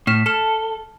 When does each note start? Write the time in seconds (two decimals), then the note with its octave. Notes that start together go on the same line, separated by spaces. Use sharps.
0.07 A2 F6 B6 E7
0.26 A4 A5 F6 E7